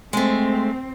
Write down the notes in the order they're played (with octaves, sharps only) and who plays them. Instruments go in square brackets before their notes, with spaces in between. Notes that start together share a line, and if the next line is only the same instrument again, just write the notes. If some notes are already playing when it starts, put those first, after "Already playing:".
[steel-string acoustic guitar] G#3 A3 [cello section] C4